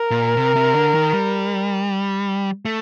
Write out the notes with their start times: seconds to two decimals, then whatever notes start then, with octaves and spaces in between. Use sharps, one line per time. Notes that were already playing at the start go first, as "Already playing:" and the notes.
Already playing: A#4
0.11 A#2
0.37 C3
0.56 C3
0.75 D3
0.95 D#3
1.13 G3
2.65 A3